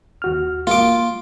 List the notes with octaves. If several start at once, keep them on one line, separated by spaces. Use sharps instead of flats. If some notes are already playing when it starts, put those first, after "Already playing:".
D#2 F#4 F6
A#3 F4 D6